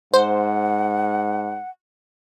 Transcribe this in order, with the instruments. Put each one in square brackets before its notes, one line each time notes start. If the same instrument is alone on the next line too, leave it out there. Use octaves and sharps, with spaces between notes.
[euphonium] G#2 [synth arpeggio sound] C5 [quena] F#5